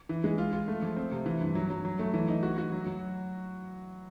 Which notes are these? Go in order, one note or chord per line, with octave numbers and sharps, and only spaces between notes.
E3
G#3
F4
F4
A3
F3
C4
C3
E3
G2
F#3
F#3
F#3
A3
E3
D#4
F#4
F#4
F#3
F#3